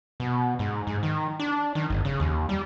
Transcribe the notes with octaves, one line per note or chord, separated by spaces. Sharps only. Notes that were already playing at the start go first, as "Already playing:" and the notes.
B2
G#2
G#2
D#3
D4
D#3
G1
C#3
D#2
G3